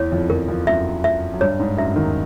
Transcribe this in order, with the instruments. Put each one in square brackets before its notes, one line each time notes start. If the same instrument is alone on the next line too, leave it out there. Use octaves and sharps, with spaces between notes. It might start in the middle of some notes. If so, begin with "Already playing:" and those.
Already playing: [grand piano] E2 E3 [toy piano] C#5
[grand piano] F2 F3
[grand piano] F2 F3 [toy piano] A#4
[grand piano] F2 F3
[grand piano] F#2 F#3 [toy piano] E5
[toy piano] E5
[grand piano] F#3
[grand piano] G2 G3 [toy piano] C#5
[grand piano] G#2 G#3
[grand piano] F#2 F#3 [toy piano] E5
[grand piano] D#2 D#3